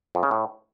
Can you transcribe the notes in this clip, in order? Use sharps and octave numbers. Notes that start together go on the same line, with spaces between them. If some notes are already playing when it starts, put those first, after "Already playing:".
F2
C#3
A2